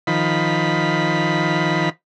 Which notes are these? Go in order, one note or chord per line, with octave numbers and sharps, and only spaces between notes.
D#3 F3 B5